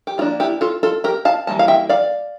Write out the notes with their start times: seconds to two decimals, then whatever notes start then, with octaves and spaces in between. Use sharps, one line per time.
0.07 G4
0.18 F3 A#3 D4 F4
0.40 E4 G4
0.61 F4 A4
0.83 F4 A4
1.04 G4 A#4
1.25 F5 A5
1.47 E3 G3 A#3 A5
1.59 F5
1.68 E5 G5
1.89 D5 F5